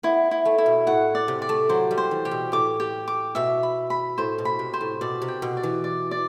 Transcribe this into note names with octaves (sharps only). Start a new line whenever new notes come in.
B3 E4
E4
A3
E4
B2
A2 F#5
D5
C3
D5
A3
F#3 C5
G3
C5
E3
C3 G4
B2
A2 D6
G4
D6
B2 E5
B5
B5
A2 C5
B2
B5
C3
C5
A2
B2 D5
C3
G5
B2
D5
E3
D5
D5